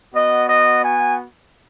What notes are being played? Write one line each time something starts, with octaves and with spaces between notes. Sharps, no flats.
B3 F#4 D#5
D#5
G#5